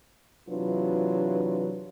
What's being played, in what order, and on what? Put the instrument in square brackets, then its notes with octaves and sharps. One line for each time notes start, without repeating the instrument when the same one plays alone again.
[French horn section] C3 E3 F#3 D4 F4 B4